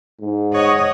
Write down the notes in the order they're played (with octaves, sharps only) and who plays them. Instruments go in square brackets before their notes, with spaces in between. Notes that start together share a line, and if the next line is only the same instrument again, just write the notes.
[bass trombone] G#2
[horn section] C#5 [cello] D#5 F#5